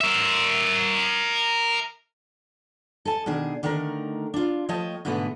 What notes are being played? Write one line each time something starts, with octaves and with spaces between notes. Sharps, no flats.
A#4 E5
A4 G#5 A5
B2 D#3 D4 G#4
D3 D#3 A3 D#4 A#4
D4 F4
F3 A3 C#5 D#5 G5 A5
G#2 B2 D3 A3 B3